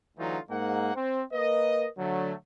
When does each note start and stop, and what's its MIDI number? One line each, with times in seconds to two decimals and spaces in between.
0.18 0.38 38
0.18 0.38 50
0.18 0.38 52
0.18 0.38 54
0.18 0.38 63
0.18 0.38 65
0.50 0.92 44
0.50 0.92 58
0.50 0.92 78
0.95 1.22 60
1.33 1.87 58
1.33 1.87 70
1.33 1.87 71
1.33 1.87 75
1.98 2.33 50
1.98 2.33 54
1.98 2.33 57